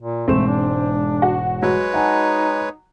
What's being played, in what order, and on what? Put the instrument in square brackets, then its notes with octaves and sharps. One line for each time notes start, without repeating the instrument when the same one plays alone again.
[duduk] A#2
[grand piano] E1 G#2 E7 [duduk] A3 [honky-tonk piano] C4
[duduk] D4
[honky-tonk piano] F#4
[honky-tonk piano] F#3 [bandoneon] G#3 B4 C#5
[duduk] D#4 [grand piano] F#5 G#5 A5